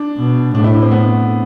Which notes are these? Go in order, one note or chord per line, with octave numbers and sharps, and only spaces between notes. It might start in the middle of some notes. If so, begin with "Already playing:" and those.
Already playing: D4
B2
A2 D4
E4
D4
C4
B3